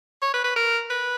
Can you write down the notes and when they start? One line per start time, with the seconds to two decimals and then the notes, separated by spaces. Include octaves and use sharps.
0.22 C#5
0.34 B4
0.44 B4
0.56 A#4
0.90 B4